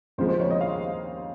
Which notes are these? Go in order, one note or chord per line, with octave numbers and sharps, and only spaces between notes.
D#2 C#3 F3 G#3 C5
C5
C#5
D#5
F5